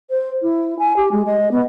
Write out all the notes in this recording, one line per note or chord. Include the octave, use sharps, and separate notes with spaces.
C5
E4
G#5
G4
G#3
D#5
B3